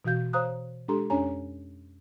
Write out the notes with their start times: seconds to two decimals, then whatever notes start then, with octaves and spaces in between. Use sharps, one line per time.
0.05 B2 E3 F#4 F5 G6
0.33 C5 C#5 F5 A#5 D#6 F#6
0.88 G#3 D4 G4 A4 A#5 C6
1.10 F2 C#4 D4 C#5 G#5 A#5